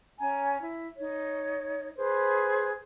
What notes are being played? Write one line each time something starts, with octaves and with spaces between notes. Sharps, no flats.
C#4 G#5 A#5
E4
D#4 C#5
G#4 B4 C5